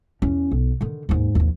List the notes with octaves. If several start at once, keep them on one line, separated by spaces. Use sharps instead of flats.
E2 C#4
B1
D3 D#3
D#2 G#2
D#2 F3